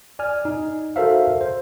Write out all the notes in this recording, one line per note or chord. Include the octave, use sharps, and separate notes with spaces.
D5 G#5 F6
D#4
F#4 A4 A#4 C5 E5 F5
C5